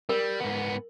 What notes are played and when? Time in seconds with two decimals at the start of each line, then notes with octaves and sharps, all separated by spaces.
0.09 G3 A#4
0.40 G#2 B3